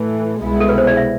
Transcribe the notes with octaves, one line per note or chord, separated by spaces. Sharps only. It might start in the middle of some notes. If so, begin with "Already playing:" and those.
Already playing: A2 E3 A3
C2 B2 G#3 B3 E4
A4
B4
C5
D5
E5